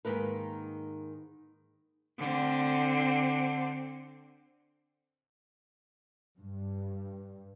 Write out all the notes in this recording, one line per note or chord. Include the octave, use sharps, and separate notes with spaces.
G#2 B2 D#3 A#3 B4
D3 C4
G2